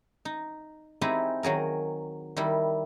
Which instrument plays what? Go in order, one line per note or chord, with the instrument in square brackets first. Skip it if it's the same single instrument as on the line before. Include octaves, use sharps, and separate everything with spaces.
[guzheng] D#4
C4 D#4 E4 G4 G#4
D#3 F#3 G#4 A#4
D#3 G3 E4